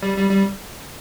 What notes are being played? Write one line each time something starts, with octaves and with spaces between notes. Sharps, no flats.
G3
G3
G3